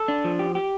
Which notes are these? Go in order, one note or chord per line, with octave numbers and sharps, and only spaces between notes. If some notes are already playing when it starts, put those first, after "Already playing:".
Already playing: A4
D4
F3
G4
G4